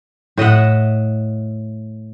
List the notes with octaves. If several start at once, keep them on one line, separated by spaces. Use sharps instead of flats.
A2 D#5 E5 F#5